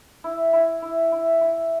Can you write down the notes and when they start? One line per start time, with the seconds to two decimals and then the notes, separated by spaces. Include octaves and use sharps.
0.24 E4
0.53 E4
0.82 E4
1.12 E4
1.41 E4